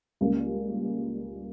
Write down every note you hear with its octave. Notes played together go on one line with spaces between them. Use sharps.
C#2 C#3 G3 A#3